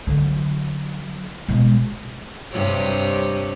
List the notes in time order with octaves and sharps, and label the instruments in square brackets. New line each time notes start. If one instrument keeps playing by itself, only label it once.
[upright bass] D3 F#3
B2 G#3
[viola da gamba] G2 C3 C#5